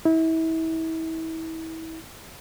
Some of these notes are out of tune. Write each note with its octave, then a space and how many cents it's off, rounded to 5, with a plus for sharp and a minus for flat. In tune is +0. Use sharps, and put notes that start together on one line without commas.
E4 -30